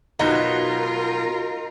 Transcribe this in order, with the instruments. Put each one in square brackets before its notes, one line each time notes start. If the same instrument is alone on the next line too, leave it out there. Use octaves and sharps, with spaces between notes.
[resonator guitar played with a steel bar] B2 F#3 B3 [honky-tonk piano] D#4 [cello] F4 A#4